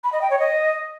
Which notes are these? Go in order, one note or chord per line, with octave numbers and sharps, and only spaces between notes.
B5
D#5
G5
C#5
D#5